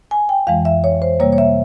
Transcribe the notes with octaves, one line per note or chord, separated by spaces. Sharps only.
G#5
G5
F2 E3 G#3 F5
E5
C#5
C5
C3 G3 A#3 C#5
C#5
E5